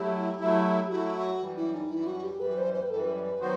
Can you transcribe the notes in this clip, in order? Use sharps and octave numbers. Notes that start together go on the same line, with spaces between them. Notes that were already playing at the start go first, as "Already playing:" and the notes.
Already playing: F#3 A3 E4 G4
F#3 A3 E4
F#3 A3 E4 F#4
F#2 E3 G3
E4
D#4
F#2 E3 G3 E4
F#4
G4
F#2 E3 G3 B4
C5
C5
B4
F#2 E3 G3 A4
B4
D#3 F#3 B3 F#4 C5